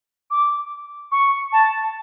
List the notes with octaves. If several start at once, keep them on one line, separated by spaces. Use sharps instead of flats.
D6
C#6
A5